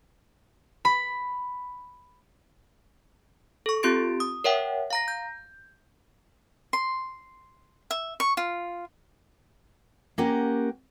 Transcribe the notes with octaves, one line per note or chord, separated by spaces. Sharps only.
B5
A4 C#6
C4 F4 G4 C6 A6 D7
D#6
A#4 C#5 E5 F#5 G5
F5 A#5 A#6
G6
C6
E5
C#6
F4
A#3 C#4 G4 A#4 F#5